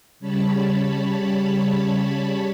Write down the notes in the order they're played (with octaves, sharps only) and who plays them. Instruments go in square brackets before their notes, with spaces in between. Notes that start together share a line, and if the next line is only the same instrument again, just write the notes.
[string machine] C#3 G3 C#5 A5 B5